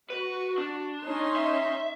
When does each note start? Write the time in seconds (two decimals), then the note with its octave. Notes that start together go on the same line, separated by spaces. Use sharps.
0.10 F#4 B4
0.58 D4
1.02 C#4 D#4 C6
1.36 E5